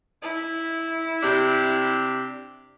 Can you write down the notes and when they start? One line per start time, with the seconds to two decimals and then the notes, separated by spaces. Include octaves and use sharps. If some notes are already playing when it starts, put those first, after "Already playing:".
0.22 E4
1.23 C3 D4 G4